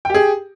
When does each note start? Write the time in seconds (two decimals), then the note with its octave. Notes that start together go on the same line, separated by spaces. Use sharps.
0.05 G5
0.10 G4
0.14 G#4